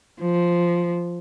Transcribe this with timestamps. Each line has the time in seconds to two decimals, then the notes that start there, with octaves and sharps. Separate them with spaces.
0.21 F3